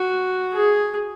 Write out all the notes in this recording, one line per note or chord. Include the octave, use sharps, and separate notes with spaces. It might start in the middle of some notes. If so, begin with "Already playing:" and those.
Already playing: F#4
G#4